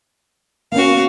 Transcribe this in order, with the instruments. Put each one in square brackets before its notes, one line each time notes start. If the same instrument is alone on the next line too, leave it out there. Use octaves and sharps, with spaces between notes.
[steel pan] A#3 B3 C#4 [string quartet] F#4 F5